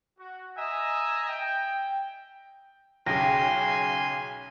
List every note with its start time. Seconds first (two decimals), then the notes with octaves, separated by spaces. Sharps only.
0.18 F#4
0.56 D#5 E5 G#5 A#5
1.28 G5
3.06 B1 C#3 G5 G#5 C6 A#6